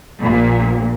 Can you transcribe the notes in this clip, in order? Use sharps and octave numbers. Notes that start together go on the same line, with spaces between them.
A#1 A#2